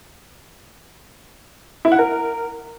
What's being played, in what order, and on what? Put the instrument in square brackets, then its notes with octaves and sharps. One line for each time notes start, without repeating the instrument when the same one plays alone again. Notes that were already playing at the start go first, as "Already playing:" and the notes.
[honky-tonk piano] E4
F#5
A#4